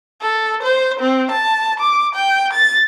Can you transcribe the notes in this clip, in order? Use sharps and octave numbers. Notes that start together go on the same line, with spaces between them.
A4
C5
C4
A5
D6
G5
A6